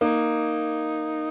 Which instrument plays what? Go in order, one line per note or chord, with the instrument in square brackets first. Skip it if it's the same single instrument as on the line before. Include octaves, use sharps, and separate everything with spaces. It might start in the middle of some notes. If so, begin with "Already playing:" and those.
[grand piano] A#3 [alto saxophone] D#4